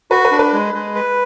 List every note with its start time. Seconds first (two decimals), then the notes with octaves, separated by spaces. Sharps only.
0.11 F#4 B4
0.25 B4
0.31 D4
0.39 B4
0.53 G#3
0.74 G#3
0.95 B4